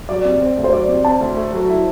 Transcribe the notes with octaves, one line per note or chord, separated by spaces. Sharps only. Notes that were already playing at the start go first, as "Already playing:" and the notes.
F#3 D5
C3
C4
D2
C5
F#3 D5
C3
C4 A5
D2
A3
F#3
E4